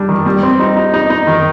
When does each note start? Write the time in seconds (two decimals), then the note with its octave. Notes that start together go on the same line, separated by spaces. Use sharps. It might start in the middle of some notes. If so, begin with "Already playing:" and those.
Already playing: G3 D4
0.09 D#3
0.26 G3
0.43 C4
0.59 D#4
0.77 D#4
0.94 D#4
1.10 D#4
1.27 D#3